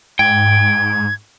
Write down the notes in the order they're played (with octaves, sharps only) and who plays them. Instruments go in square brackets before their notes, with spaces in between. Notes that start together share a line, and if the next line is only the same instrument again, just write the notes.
[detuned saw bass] G#2 [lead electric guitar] G5 [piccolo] G#6